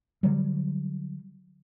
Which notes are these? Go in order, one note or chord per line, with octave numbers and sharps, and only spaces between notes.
D3 F#3 G3